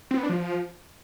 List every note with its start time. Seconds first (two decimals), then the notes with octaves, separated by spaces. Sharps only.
0.11 C4
0.17 B3
0.23 D4
0.29 F3